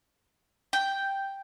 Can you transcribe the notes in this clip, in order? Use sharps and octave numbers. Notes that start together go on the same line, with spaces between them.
G5